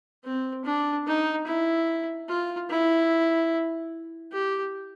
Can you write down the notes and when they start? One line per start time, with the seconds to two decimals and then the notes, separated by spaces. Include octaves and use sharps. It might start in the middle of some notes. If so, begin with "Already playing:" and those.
0.24 C4
0.65 D4
1.07 D#4
1.47 E4
2.28 F4
2.70 E4
4.32 G4